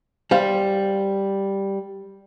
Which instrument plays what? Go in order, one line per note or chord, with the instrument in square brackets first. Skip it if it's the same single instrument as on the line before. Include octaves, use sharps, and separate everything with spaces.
[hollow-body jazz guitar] G3 C5 F5